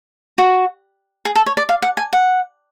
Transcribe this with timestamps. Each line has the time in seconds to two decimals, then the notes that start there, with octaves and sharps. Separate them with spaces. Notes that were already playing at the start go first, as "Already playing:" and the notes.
0.38 F#4
1.25 G#4
1.35 A4
1.46 C#5
1.57 D5
1.69 F5
1.82 F#5
1.97 G#5
2.13 F#5